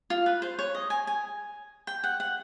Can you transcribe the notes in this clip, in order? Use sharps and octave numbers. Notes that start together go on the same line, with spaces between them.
F4
B4
C5
C#5
D#5
G#5
G#5
G5
F#5
F#5